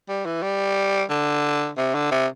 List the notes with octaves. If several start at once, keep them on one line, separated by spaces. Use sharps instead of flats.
G3
E3
G3
D3
C3
D3
C3